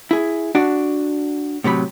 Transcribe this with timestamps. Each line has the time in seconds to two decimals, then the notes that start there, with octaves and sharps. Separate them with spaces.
0.11 E4 G#4
0.55 D4 F#4 D5
1.64 A2 C3 F#3 B5